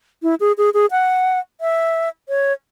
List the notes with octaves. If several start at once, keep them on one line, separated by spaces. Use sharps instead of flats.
E4
G#4
G#4
G#4
F#5
E5
C#5